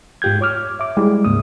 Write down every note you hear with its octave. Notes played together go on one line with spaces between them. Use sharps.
G#2 F4 G4 G6 G#6
C#5 D6 F6
E5 D6
G3 G#3 E4
D2 G#2 C#3 A#3 D#6